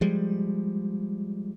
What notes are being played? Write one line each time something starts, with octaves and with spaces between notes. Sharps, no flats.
F3 G3 G#3